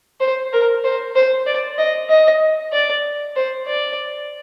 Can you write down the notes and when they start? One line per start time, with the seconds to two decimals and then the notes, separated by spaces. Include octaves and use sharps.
0.20 C5
0.53 A#4
0.84 C5
1.15 C5
1.46 D5
1.78 D#5
2.10 D#5
2.72 D5
3.36 C5
3.67 D5